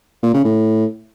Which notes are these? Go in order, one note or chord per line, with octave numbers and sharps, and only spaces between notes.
A#2
C#3
A2